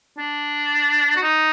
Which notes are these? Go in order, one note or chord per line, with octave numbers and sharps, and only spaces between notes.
D4
F#4
D#4